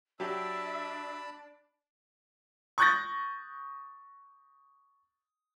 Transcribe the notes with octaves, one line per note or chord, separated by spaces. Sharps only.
F#3 D4 G4 E5 A5 B5
C#6 D#6 F#6 G6 A6 A#6